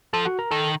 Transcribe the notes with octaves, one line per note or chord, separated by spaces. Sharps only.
F3 A4 A5
F#4 F#5
A#4 A#5
D#3 A4 A5